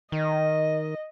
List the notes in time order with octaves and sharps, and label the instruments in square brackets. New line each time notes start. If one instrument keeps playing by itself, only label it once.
[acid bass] D#3 [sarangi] D#5